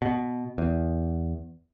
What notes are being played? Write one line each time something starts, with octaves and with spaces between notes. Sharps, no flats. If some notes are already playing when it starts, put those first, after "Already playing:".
B2
E2